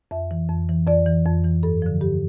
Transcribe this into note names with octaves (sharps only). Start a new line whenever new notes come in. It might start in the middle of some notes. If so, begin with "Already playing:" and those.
F2 E5
E3
F2
E3
F2 D5
E3
F2
E3
G2 A4
D3 F3
G2 G4